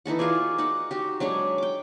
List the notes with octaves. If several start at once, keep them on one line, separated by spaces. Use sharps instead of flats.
E3 D#4 A4 F#5
F4 F#4 G#4 D5
D#4 D5 F#5
D#4 F#4 G4
F#3 G#3 D4 C#5
G5 D6